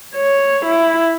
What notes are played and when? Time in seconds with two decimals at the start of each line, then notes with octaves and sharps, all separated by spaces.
0.15 C#5
0.65 E4